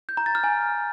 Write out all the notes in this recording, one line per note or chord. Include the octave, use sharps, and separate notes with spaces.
G6
A#5
A6
F6
G#5